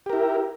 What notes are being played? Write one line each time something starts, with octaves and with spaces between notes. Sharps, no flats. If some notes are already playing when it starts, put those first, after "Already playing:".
E4 G4 A#4